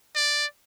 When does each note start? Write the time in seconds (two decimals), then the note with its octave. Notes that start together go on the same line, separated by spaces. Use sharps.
0.16 D5